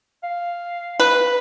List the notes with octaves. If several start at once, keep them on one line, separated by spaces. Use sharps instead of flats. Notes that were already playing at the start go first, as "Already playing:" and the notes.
F5
B4